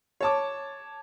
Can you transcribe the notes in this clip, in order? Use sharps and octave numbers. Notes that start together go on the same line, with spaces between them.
C#5 A5 D6